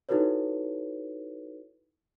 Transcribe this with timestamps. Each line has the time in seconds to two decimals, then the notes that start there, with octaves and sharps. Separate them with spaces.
0.09 D#4 E4 F#4 A4 B4 C#5